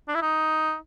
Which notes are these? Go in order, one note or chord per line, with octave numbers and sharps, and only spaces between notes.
D4
E4
D#4